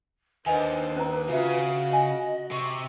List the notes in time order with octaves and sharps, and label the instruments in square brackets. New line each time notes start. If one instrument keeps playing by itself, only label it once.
[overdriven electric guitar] D#2 [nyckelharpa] D4 C5 [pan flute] B4 [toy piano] D#5 F#5 G#5
[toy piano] C#4 A#4 A#5
[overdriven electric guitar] C#3 [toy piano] F4 E5 [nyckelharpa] F#4
[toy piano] C#5 G#5 [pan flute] D#5
[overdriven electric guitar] C3 [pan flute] C#6